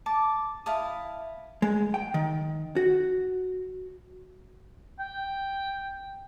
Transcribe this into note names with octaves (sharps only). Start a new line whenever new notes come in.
A5 D6
E4 F5 A5 D#6
G#3
G5
D#3
F#4
G5